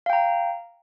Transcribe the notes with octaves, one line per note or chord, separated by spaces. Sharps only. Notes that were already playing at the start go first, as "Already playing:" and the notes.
F5 G5 A#5